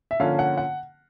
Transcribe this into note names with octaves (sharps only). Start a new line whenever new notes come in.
E5
D3 F3 A#3 C#4 F5
F#5
F#5